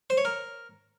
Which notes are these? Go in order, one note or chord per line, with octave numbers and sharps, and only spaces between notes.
C5
C#5
A#4